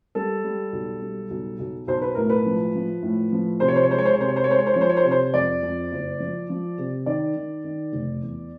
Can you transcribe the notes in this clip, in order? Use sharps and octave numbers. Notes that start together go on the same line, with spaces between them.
G3 A4
G3
B1
G3
B1
B1
B1 C5
B4
A2 A#4
B4
F3
F3
A2
F3
C3 C5
C#5
C5
C#5
G#3 C5
C#5
C5
C#5
C3 C5
C#5
C5
C#5
G#3 C5
C#5
C5
F3 C#5
C5
C#5
C5
C3 C#5
C5
F2 D5
F2
F#1
F3
F3
C3
D#3 D5
D#3
D#3
F1
E2